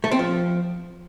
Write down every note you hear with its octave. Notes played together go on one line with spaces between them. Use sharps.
A3
C4
F3